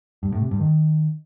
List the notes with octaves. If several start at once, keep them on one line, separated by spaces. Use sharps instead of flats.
G2
A2
C3
G2
D#3